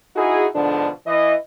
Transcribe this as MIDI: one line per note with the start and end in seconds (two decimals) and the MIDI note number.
0.16 0.47 63
0.16 0.47 64
0.16 0.47 66
0.16 0.47 68
0.55 0.89 44
0.55 0.89 47
0.55 0.89 50
0.55 0.89 53
0.55 0.89 62
1.07 1.34 52
1.07 1.34 75